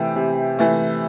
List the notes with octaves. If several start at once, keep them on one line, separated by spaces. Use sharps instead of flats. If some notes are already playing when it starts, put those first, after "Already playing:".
Already playing: C3 E3 A3 G5
C3
E3 A3